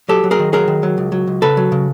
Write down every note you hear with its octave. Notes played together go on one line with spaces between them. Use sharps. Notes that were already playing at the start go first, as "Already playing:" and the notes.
F#3 G4 A4
F#3
G#4 A#4
D#3
F#3 G#4 A#4
D#3
F#3
C#2
F#3
C#2
C#3 A4 B4
F#3
C#3